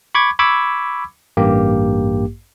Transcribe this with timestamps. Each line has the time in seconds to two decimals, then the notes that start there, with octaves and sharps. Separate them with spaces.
0.15 B5 C#6 D6 G#6
0.39 B5 C#6 D6 E6 G#6
1.37 A1 G2 A#3 G4